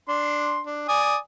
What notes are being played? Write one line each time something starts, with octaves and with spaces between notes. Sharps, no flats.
D4 C6
D4
D5 G#5 D#6